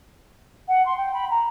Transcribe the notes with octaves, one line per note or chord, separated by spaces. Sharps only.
F#5
C6
G5
B5
A#5